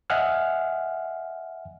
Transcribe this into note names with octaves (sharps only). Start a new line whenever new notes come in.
D#5 E5 F#5 G#5 F6